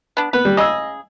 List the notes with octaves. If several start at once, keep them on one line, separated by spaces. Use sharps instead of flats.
B3 D4
B3 B4
G3
C#3 G#4 D#5 E6